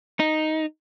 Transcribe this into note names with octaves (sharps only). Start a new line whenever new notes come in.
D#4